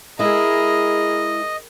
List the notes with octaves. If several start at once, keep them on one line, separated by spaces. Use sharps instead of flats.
G#3 E4 G#4 A#4 D#5